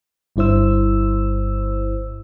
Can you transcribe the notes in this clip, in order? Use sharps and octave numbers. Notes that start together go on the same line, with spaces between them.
G1 G2 E4 C5 E6